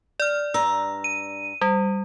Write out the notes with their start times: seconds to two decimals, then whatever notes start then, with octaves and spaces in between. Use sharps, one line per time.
0.20 D5 F6
0.54 G2 A#5 E6
1.04 D#7
1.61 G3